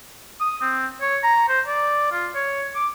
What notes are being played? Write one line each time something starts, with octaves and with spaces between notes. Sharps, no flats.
D#6
C4
C#5
A#5
C5
D5
F4
C#5
D6